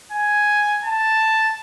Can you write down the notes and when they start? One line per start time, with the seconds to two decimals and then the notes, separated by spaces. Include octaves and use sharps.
0.12 G#5
0.84 A5